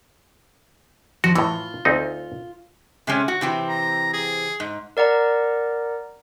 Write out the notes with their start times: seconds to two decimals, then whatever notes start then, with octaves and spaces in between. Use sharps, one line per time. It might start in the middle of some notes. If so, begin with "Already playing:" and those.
1.24 F3 F#4
1.35 A2 E3 F4
1.85 D2 C4 D#4
3.07 C3 G#3 C#4
3.28 F#4
3.41 C3 E3 C4
3.69 A#5
4.13 G#4
4.60 G#2
4.97 A#4 D5 F#5 A#5